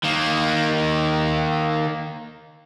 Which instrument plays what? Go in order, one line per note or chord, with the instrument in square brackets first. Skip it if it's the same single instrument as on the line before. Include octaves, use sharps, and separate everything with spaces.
[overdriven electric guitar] D#3 A#3